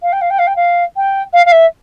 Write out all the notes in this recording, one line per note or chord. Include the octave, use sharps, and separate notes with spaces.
F5
G5
F5
G5
F5
G5
F5
G5
F5
F5
E5